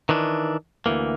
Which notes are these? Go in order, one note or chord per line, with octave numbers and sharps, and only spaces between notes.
D#3 E3 D4
D2 G#2 E3 A#3